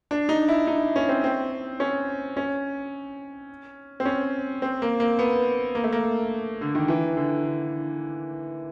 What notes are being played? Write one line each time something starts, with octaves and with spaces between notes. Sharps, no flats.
D4
D#4
E4
D#4
C#4
C4
C4
C#4
C#4
C4
C#4
C4
A#3
A#3
B3
A#3
A3
A#3
D3
D#3
E3
D3
D3